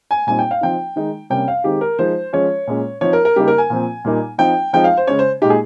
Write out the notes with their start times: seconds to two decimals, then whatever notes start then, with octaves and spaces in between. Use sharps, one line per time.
0.11 G#5
0.27 A#2 G3 C4 D#4 G#5
0.39 G5
0.51 F5
0.61 F3 C4 D#4 G5
0.96 D#3 G#3 D#4
1.30 C3 G3 A#3 C#4 G5
1.48 F5
1.64 D#3 G#3 C4 G4
1.81 A#4
1.99 F3 G#3 D#4 C5
2.33 F3 G#3 C#4 C#5
2.67 A#2 G#3 C#4
3.01 F3 C4 D#4 C#5
3.13 A#4
3.25 A#4
3.36 C#3 G3 A#3 D#4 G4
3.48 A#4
3.58 G#5
3.70 A#2 F3 C4
4.05 A#2 G3 A#3 D#4
4.38 F3 C4 D#4 G5
4.73 F3 G#3 C4 D#4 G5
4.84 F5
4.97 C5
5.07 C#3 G#3 C#4 C#5
5.19 C5
5.42 A#2 G#3 D#4 G4
5.50 G#4